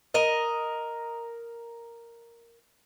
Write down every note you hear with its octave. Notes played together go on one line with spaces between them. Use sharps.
A#4 D#5